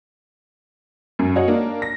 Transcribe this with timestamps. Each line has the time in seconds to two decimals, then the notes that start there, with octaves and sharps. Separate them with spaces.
1.19 F#2
1.36 F#4 C#5 D#5 F#5
1.48 A#3 D4
1.82 A#6